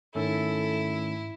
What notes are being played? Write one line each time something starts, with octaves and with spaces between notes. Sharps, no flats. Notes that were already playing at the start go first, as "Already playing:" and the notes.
G#2 D#3 A3 C#4 E4 A4